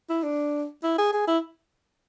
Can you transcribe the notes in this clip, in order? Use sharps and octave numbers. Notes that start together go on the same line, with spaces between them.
E4
D4
E4
G#4
G#4
E4